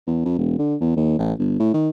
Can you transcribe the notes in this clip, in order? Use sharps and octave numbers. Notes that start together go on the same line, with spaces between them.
E2
F2
E1
D3
E2
D#2
A1
G1
A2
D#3